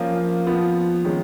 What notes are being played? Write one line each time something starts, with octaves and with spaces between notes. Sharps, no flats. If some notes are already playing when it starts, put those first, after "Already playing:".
Already playing: F3 A#3 C#4 F4
F3 B3 F4
D#3 G#3 C#4